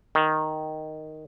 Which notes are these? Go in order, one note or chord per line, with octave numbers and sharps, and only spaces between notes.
D#3